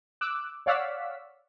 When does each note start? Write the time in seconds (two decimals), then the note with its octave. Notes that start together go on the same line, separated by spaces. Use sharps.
0.21 D6 E6 F#6
0.66 C#5 D5 F5 F#5 E6 B6